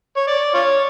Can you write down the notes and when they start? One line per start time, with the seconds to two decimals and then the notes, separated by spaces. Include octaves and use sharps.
0.16 C#5
0.27 D5
0.54 F4 C#5